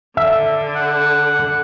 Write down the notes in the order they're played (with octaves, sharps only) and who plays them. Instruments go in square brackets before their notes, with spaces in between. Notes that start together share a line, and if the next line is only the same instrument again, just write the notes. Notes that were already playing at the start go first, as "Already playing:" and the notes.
[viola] D3 [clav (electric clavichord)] E5
[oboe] F#5